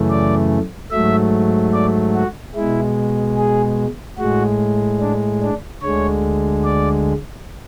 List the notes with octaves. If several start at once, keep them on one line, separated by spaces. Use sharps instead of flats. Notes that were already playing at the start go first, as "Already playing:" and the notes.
Already playing: F#2 C#3 E3 A3
D5
G#2 F#3 A3 E5
D5
F#4
B2 G#3 E4
G#4
A2 G#3 F#4
D4
D4
D2 D3 G#3 C#5
D5